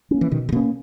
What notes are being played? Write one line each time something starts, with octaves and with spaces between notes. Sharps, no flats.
A#3 C#4
E3
B2 D#3
C#3
B2 A#3 C#4